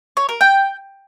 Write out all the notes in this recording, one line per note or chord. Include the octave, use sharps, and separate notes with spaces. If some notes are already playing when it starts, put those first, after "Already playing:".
C#5
A#4
G5